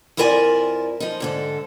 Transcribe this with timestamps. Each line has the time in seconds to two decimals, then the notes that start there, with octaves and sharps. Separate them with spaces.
0.17 F2 E4 F4 A#4 D5 G#5
1.00 F3 D#4
1.20 G#2 D3 A4